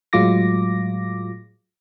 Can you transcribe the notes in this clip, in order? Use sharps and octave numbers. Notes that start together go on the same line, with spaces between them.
A2 F#3 G#3 F4 D6 A#6